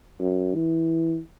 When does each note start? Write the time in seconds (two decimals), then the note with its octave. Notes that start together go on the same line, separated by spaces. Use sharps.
0.20 F#2
0.55 E3